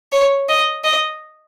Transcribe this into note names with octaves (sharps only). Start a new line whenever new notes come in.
C#5
D#5
D#5